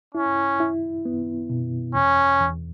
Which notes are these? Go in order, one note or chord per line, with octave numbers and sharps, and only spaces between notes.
C#4 E4
E4
B3
B2
E2 C#4
E2